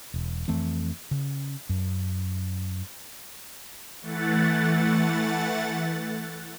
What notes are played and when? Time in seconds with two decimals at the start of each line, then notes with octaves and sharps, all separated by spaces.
0.14 E1
0.48 F2 E3 A3 C4
1.11 C#3
1.69 F#2
4.02 E3 A3 F#5 A6